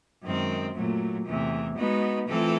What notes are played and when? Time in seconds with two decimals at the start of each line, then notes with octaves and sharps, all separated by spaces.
0.23 F#2 D#3 G#3 C4
0.74 A#2 F#3 A3
1.25 E2 C3 E3 A3
1.77 G#3 B3 D#4 F#4 B4
2.28 E3 A3 C4 F4 A4